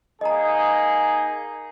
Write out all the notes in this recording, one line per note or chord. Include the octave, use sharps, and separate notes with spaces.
A#3 D#4 G#4 D#5 A#5